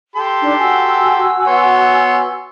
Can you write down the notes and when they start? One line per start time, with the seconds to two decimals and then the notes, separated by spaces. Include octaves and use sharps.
0.16 G4 A4 C6
0.41 D4 D#4
0.59 F#4 G#5 E6
1.47 B3 C#5 C6